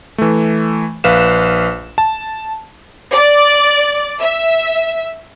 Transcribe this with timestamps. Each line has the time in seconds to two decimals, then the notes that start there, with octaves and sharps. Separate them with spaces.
0.18 E3 A3
1.04 A#1 B4 F5 E7
1.98 A5
3.14 D5
4.21 E5